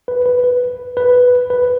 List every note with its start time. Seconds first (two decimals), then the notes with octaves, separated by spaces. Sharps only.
0.08 B4
0.26 B4
0.44 B4
0.97 B4
1.50 B4